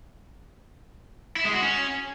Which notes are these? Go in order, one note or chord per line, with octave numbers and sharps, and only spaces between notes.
E4
G#3
F#4
C#4